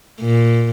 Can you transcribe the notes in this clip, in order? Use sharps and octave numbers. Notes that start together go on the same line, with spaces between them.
A#2